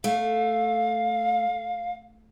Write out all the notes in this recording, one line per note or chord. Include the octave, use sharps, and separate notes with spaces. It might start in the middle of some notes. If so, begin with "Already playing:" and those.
A3 F5